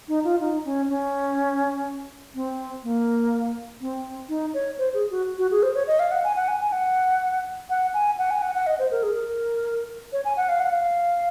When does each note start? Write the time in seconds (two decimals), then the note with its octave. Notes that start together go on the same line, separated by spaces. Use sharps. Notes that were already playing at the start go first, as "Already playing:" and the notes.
0.08 D#4
0.24 F4
0.41 D#4
0.65 C#4
0.89 C#4
2.35 C4
2.83 A#3
3.81 C4
4.29 D#4
4.54 C#5
4.78 C5
4.94 G#4
5.11 F#4
5.39 F#4
5.51 G#4
5.63 C5
5.75 C#5
5.88 D#5
5.99 F5
6.11 F#5
6.24 G#5
6.36 F#5
6.48 G#5
6.61 G#5
6.72 F#5
7.70 F#5
7.94 G#5
8.19 F#5
8.30 G#5
8.42 F#5
8.55 F#5
8.67 D#5
8.79 C5
8.91 A#4
9.03 G#4
9.15 A#4
10.13 C#5
10.25 G#5
10.37 F#5
10.49 F5
10.60 F#5
10.70 F5